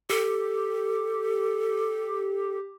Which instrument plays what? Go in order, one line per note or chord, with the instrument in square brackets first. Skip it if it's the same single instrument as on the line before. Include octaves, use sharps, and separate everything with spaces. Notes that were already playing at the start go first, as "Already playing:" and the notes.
[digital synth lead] G4 [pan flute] A4